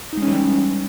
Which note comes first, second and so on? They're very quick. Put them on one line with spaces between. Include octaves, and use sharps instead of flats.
D#4 G#3 C#4 E3 G3